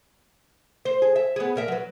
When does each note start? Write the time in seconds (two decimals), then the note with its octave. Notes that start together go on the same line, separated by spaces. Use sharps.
0.85 C5
1.02 G#4
1.16 E5
1.36 B3 G#4
1.56 A#2 A#4 E5
1.68 F#3 B4